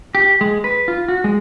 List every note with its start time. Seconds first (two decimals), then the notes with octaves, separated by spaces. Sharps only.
0.15 G4
0.41 G#3
0.64 B4
0.88 F4
1.08 F#4
1.24 G#3